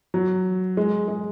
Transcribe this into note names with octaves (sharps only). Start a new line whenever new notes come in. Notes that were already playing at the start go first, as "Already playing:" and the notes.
F#3
G#3
G#3